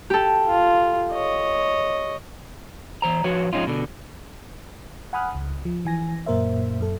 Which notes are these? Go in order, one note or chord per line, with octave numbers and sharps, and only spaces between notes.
G4 A4
F4
C#5 D#5
E3 C5 A#5
F3 F#4 B4 C#5
F3 G#3 C4 C#4 D#4 F4
B2 D3
F#5 G#5 B5 D#6 F6 F#6
C#2
F3
E3 G#5 A#6
F#2 A#2 A#3 A#4 C5 E5
F#2 A4